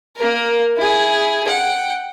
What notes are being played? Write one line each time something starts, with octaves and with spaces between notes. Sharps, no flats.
A#3 A#4
E4 G#4
F#5 G5